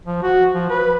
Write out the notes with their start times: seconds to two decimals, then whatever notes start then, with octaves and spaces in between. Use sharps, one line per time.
0.06 F3
0.23 F#4
0.54 F3
0.70 B4